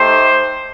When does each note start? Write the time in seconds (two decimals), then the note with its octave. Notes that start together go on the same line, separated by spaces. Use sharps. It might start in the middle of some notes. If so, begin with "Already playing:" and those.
Already playing: A3 D#4 G4 C5